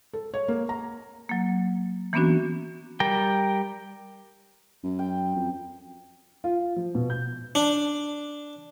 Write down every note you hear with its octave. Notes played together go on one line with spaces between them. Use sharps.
A4
C#5
A#3
A#5
F#3 A#3
E3 A#3 B3 C#4 D4 F#4
G3 A#4 G5
F#2
G5
F2
F4
F3
B2
G6
D4